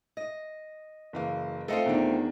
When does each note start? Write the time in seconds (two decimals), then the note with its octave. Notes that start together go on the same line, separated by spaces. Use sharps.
0.17 D#5
1.13 F#1 E3 F5
1.68 A3 C4 F4 A4 D#5 F5
1.86 E2 D#3 D4